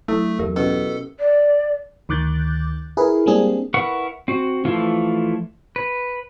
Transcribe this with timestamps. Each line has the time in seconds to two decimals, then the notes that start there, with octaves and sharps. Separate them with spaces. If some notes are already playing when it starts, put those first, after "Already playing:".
0.08 F#3 A3 D4 E4 A4 E6
0.39 E2 F#3 G4 A#4 E5
0.56 B2 C#4 A4
1.19 D5
2.09 D2 D#3 D6 F#6 G6 A6
2.97 E4 G#4 A#4 B4
3.26 G3 G#3 A#3 C4 D4 G#4
3.74 E4 A#4 B4 F#5 C#6
4.28 C4 F#4
4.65 E3 F3 A3 E4 F4
5.76 B4